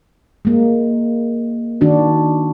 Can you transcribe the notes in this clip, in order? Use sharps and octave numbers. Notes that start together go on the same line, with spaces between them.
G#3 A#3
D#3 D4 F#4